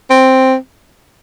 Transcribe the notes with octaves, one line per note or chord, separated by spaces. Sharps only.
C4